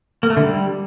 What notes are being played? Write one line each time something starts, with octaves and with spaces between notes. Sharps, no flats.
A#3
A3
D3
G3